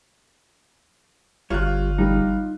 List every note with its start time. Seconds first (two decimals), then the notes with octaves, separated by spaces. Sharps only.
1.50 G1 G3 F4 C#5 F#6
1.98 G3 D#4